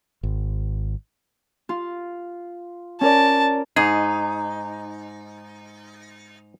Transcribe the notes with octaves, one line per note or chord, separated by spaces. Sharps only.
G#1
F4
C#4 A#4 D5 A5
G#2 D#4 G#4